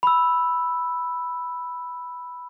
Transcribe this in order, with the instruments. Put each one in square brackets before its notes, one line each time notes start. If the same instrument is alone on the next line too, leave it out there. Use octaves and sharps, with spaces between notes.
[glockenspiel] B5 E6